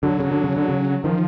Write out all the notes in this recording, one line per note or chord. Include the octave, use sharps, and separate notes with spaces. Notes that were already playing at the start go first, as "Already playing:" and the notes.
D3 F#3
C#3
D3
C#3
D3
C#3
D#3 F3